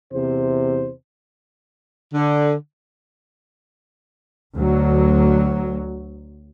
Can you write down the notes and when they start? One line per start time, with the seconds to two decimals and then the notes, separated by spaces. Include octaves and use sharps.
0.13 E2 C3 C5
2.14 D3
4.55 D2 F#3